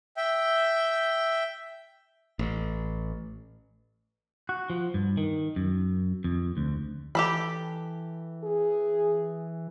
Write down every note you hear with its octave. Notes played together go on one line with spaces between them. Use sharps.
E5 G5
A1
F#4
F3
G2
D#3
F#2
F2
D2
E3 G4 A4 B5
G#4